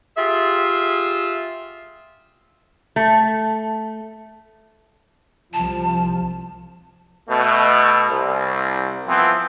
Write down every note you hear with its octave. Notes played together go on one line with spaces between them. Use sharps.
F4 G4 G#4 E5
A3
C2 F3 A5
B2 A3
C2
E3 F3 B3 C4